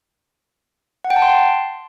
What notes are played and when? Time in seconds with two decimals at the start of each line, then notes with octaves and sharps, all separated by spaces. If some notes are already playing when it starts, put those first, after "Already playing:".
1.05 F#5
1.10 G5
1.16 A5
1.22 C6